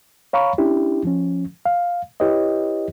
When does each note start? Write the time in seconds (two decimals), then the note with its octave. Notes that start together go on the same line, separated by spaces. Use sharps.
0.33 C#5 F5 A#5 B5 C#6
0.58 C#4 D4 E4 G4
1.05 F3 C#4
1.66 F5
2.20 E4 G4 B4 C#5 D#5